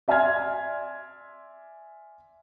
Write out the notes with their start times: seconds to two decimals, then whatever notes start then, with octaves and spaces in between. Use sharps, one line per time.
0.08 D5 E5 G#5 C6 F6 G#6